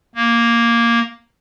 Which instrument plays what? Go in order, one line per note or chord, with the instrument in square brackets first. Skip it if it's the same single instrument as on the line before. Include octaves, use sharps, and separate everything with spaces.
[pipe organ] A#3